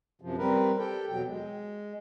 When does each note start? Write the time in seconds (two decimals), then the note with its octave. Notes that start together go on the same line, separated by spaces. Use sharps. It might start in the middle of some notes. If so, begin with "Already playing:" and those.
0.22 F#2 C3 F3
0.38 G3 C4 A#4 B4
0.78 G4 A4 G5
1.10 E2 B2 F#3 G5
1.28 G#3